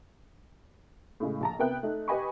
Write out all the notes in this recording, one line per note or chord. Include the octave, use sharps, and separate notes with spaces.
A2 C#3 G#3
A#1 A5 A#5
C3 B3 A#4 E5 G5 F#6
A3 D#4
G4 B4 D#5 G#5 B5 C#6